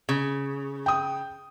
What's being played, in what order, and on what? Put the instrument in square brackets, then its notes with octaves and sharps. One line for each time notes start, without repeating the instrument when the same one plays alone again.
[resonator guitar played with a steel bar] C#3
[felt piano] G5 D#6